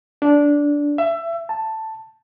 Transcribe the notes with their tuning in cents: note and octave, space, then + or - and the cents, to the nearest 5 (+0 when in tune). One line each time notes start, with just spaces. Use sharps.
D4 -15
E5 +20
A5 +5